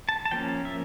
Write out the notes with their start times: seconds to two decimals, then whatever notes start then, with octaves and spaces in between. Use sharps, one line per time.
0.09 A5
0.25 A5
0.31 F3 A#3 C#4 G5
0.65 E5